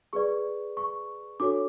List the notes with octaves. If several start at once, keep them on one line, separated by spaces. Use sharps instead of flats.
G#4 B4 D5 C#6
C#6
D4 F#4 A4 C#5 D6